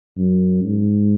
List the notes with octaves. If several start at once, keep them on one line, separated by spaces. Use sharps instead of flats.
F#2
G#2